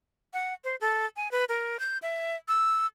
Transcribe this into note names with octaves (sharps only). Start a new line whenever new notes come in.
F#5
C5
A4
G#5
B4
A#4
G6
E5
E6